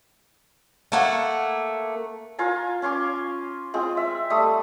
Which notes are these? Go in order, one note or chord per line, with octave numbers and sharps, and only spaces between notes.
A3 A#3 F#5
F4 F5 G#5 A#5
C#4 G#5 C6 D6
G#3 C4 F4
E5
G3 A3 D#6